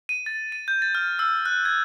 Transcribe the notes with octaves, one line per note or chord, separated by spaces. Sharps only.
D#7
A6
D#7
G6
A6
F6
E6
F#6
G#6